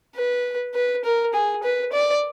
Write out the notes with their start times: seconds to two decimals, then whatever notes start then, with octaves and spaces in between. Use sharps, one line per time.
0.16 B4
0.75 B4
1.04 A#4
1.34 G#4
1.63 B4
1.93 D5